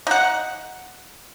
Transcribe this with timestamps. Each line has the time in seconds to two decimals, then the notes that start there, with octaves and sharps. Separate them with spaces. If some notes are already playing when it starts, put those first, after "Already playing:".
0.07 D#4 F#5